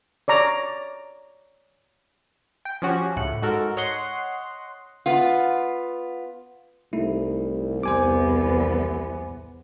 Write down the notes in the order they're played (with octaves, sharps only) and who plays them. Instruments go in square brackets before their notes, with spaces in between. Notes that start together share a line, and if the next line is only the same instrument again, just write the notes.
[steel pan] C#5 D5 A#5
[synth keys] G5
F3 C#4 F#4 G4
C#2 A2 F#6 C#7
G#2 F#4 A4 A#4
C#5 D#5 F#5 C6
[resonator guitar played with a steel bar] B3 F4
[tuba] C2 [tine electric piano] A3 D#4 E4
[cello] E2 B3 [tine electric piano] C5 G#5 D6